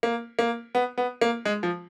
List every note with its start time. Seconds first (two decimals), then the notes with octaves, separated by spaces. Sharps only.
0.03 A#3
0.39 A#3
0.75 B3
0.98 B3
1.21 A#3
1.45 G#3
1.63 F3